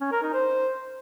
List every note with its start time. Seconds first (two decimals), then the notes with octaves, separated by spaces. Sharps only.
0.01 C#4
0.12 A#4
0.22 D#4
0.33 C5